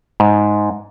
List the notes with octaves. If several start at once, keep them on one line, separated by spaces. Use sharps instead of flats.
G#2